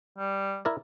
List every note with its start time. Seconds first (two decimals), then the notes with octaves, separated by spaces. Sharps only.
0.18 G3
0.65 E4 A#4 D5